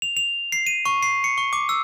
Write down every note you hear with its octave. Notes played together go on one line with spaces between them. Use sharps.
F7
F7
C7
D#7
C#6
C7
C#7
C#6
D6
E6